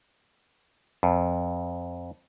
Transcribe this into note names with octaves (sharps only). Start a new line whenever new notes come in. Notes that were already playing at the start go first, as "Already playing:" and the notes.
F2